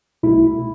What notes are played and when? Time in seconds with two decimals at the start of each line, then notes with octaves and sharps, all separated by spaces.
0.23 C2 B2 A3 E4